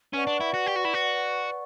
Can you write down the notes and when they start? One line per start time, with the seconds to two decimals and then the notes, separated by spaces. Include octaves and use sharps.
0.13 C#4 B4 D5 F#5 C#6
0.27 D4
0.40 E4
0.54 F#4
0.66 G4
0.76 F#4
0.85 E4
0.94 F#4